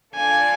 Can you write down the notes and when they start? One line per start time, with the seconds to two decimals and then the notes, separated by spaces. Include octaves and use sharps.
0.16 D4 F4 A4 D5 F5 G#5